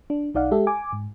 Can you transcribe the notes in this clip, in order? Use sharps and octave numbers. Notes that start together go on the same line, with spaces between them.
D4
B1 D#4 D5 F5 F#5
G#3 G4 A4 E5
G#5 D6
G#2